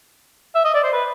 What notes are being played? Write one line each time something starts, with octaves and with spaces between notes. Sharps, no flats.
E5
D#5
D5
C5
B4